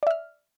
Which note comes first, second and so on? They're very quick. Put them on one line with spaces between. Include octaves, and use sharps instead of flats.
D5 E5 F6